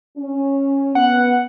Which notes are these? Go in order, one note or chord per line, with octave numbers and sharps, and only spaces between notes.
C#4
B3 F#5